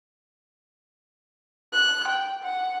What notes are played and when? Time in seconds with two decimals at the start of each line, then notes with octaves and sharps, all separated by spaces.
1.73 F#6
2.08 G5
2.43 F#5